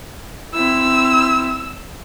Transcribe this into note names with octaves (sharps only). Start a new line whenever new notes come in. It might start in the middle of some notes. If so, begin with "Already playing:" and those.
C4 E4 E6